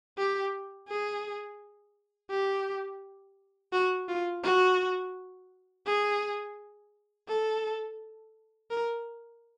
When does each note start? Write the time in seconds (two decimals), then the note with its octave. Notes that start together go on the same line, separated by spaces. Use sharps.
0.18 G4
0.89 G#4
2.31 G4
3.73 F#4
4.09 F4
4.44 F#4
5.86 G#4
7.28 A4
8.71 A#4